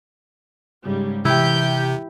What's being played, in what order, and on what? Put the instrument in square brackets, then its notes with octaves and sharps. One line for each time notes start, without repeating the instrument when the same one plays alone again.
[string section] G#2 C#3 G3
[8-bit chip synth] C3 [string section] E3 G4 G6 [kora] E4